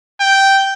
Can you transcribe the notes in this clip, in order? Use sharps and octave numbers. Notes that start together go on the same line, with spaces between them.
G5